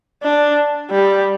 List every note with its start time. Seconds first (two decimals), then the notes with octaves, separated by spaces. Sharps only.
0.23 D4
0.90 G3